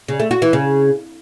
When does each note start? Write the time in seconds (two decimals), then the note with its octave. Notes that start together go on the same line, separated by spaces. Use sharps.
0.08 C#3
0.20 A3
0.31 F#4
0.42 E3
0.53 C#3